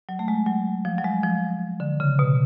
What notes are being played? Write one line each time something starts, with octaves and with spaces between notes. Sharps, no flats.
F#3
A3
G#3
F#3
F3
F#3
G#3
F3
D3
C#3
B2